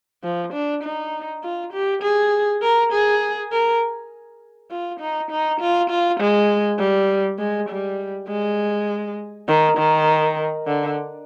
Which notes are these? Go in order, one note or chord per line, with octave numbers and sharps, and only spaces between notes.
F3
D4
D#4
F4
G4
G#4
A#4
G#4
A#4
F4
D#4
D#4
F4
F4
G#3
G3
G#3
G3
G#3
D#3
D#3
D3